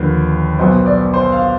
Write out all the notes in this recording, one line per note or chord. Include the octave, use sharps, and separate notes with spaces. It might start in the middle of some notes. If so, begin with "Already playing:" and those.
Already playing: D#2 D3 F3 B4
B1 B2 B3 C5
D5
C5
F5